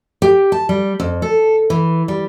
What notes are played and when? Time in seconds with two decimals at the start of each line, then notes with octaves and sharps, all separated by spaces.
0.22 G4
0.52 A5
0.69 G3
1.00 F2
1.22 A4
1.70 E3
2.08 G3